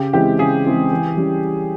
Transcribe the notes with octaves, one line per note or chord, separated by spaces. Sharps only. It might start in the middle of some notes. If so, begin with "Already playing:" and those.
Already playing: C#3 G4
E3 G#3 C4 E4 G4
C#3 G#4
E3 G#3 C4 E4
E3
G3 C#4